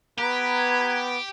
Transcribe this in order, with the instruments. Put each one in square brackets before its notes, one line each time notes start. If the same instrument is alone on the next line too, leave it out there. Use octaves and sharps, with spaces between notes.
[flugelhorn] B3 [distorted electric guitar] G4 [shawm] B4 [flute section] A#5 G#6